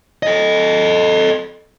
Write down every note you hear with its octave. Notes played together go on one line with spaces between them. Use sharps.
A4 D#5